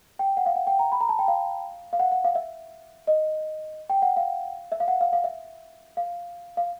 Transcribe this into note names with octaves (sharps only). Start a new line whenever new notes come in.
G5
F#5
F5
F#5
G5
A#5
B5
A#5
A5
G5
F5
F5
F#5
F#5
F5
E5
D#5
G5
F#5
F5
E5
F5
F#5
F5
F5
E5
F5
F5